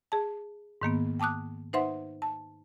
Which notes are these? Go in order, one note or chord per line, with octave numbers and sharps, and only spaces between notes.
G#4 A5
G#2 D#3 A#3 B3
G5 A5 D6 D#6 F#6
D#4 B4 C5 E5 F#5 C6
A5